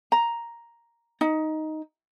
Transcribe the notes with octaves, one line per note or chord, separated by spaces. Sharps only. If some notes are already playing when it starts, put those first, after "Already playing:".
A#5
D#4